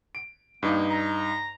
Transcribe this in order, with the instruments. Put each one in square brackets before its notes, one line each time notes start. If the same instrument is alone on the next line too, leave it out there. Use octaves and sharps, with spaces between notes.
[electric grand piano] D7
[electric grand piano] G2 D#4 [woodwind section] A#3 B3
[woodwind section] A#5